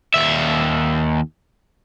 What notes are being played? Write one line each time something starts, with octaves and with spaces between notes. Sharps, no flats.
D#2 E5